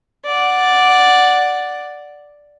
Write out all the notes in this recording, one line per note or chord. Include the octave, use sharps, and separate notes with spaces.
D5 F#5